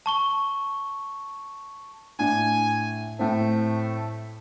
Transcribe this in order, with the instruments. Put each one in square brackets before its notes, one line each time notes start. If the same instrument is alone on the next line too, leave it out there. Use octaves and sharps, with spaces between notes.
[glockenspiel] A5 C#6 G7
[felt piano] A2 D4 [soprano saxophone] G#5
[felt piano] A2 C4 [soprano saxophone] A3